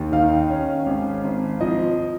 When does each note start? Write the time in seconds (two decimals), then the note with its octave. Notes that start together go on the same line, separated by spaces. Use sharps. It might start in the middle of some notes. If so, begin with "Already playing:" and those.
Already playing: D#2
0.12 D#3 F5
0.49 C#4
0.86 G#1
1.24 G#1
1.61 F3 D#5